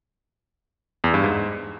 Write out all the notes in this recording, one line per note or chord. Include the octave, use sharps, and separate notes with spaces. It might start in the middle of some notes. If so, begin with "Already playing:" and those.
E2
G2
G#2